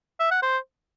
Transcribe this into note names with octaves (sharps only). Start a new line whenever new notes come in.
E5
F#5
C5